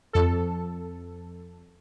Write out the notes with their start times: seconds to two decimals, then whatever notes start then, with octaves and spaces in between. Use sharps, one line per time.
0.13 F2 A4